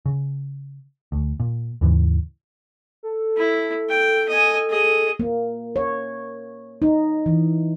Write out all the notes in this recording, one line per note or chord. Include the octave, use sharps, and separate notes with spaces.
C#3
D2
A#2
D#2 G#2 C#3 E3
A4
E4
G5
D#5 G#5
G#4 D#5
A#3
C#5
D#4
E3